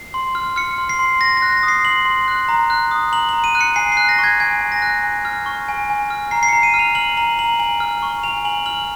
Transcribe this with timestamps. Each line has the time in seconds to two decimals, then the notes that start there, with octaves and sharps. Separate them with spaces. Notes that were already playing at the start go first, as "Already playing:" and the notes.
Already playing: C7
0.14 C6
0.35 F6
0.56 F6 C#7
0.78 C6
0.89 C7
0.99 C6
1.21 C6 A#6
1.37 F#6 A#6
1.52 A#6
1.63 D#6
1.68 C7
1.85 C6 F#7
2.05 C6
2.28 F#6
2.48 A#5
2.70 F#6
2.91 D#6
3.12 A#5 F#7
3.29 A#5 F#7
3.44 D#7
3.55 F#6
3.61 C#7
3.76 G#5 C7
3.92 C7
3.97 F#6
4.09 A#6
4.19 C#6
4.24 G#6
4.40 G#5 G#6
4.61 G#5
4.72 A#6
4.82 F#6
5.03 G#5
5.25 F6
5.46 C#6
5.69 G#5
5.90 G#5
6.10 F6
6.31 A#5 C7
6.43 C7
6.48 A#5 C#7
6.63 D#7
6.74 F6
6.79 F7
6.95 F6 F#7
7.17 A#5 F#7
7.39 A#5 F#7
7.59 G#5 F#7
7.80 F6
8.03 C#6
8.23 G#5 F7
8.45 G#5 F#7
8.66 F6 F#7